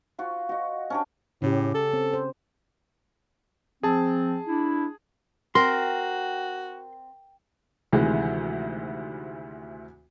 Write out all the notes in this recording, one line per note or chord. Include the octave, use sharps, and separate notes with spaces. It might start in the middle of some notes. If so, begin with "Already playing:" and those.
F4 F#4 C6
F#4 D#5
C#4 D4 G4
A2 C#3 C#4 G4
A4
C4
C5
F3 C4 G#4 A5
D4 E4
C4 F#4 A#4 C6
D2 C3 D#3 E3 G#3